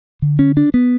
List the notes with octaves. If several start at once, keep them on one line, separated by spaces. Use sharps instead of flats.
D3
C#4
D4
B3